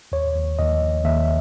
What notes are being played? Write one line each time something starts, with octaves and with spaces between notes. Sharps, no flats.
D#2 C#5
D#2
D#2 D#5
D#2
D#2 E5